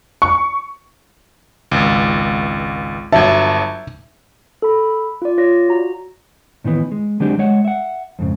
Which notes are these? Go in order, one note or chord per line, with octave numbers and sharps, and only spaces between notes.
C#6
G#1 C#2
G1 F#3 E5 A5
A4 B5
F4 D5
F4 C#5 D5 A#6
F#4 A#5
A2 D#3 E3 B3
G#3
D3 F#3 G#3 C4 D4 G4
G#3 C#5 F#5
E5 F#5
F2 G#2 C#3